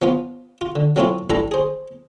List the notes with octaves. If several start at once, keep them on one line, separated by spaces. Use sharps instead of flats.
F3 B3 F4
F4
D3
F#3 A3 C4 C#4 E4 F4
A1 G2 G3 E4 A4 A#5
G#4 C5